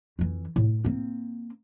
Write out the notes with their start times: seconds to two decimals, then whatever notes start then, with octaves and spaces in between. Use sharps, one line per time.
0.19 F2 E3
0.56 A2
0.85 A#3 C4